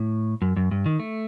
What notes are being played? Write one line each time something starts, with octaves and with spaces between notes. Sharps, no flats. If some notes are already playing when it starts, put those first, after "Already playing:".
Already playing: A2
F#2
F#2
G2
D#3
A3